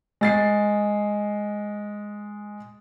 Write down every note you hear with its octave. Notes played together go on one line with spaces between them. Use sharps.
G#3 A6 C7